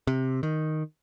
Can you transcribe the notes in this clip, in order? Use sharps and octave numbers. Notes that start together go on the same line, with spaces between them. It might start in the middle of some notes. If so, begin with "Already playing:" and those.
C3
D#3